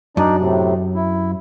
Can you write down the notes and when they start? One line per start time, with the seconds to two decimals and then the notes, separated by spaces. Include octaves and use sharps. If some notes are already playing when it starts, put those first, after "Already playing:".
0.17 F#2 D4 D#4 D5
0.38 A2 C3
0.95 E4